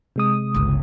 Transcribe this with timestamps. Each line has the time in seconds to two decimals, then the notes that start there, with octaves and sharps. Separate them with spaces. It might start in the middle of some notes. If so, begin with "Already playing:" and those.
0.16 C3 G#3 D#6
0.54 G1 C#2